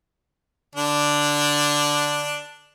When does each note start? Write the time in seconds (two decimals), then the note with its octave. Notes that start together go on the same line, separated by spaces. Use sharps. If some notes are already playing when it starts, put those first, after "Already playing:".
0.75 D3 D4